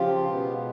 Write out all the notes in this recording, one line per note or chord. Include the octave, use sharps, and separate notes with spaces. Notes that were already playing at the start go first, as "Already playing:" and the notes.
Already playing: C#3 F3 F4 G4
B2 G#3 B3